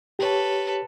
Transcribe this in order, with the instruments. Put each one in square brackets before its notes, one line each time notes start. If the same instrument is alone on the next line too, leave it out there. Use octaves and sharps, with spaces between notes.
[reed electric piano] G4 C#5 [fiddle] A4 B4